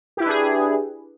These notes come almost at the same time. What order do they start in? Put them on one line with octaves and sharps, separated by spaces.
G4 E4 B4 D4 G#4